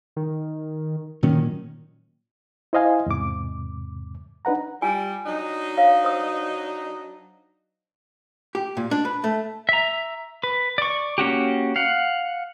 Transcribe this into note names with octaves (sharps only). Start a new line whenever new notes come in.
D#3
A#2 D#3 F#3 C#4
E4 C5 D#5 F5 G#5
E2 G#2 C3 D6
D4 D#4 B4 F#5 A#5
G3 F4 G#5
F#3 D4 D#4
C#5 F5
C5 D#6
G4
A#2
D4
B4
A3
E5 A#5
B4
D5 C#6
A#3 C#4 F#4 G4
F5 F#5